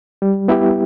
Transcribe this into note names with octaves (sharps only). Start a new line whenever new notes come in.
G3
B3 E4 G4